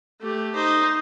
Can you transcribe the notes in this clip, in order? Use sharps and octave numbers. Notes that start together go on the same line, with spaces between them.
A3 G4
D#4 C5